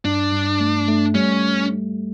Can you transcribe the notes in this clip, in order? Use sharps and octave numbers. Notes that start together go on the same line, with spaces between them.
G2 D4
G2
A3
A3
G3 C#4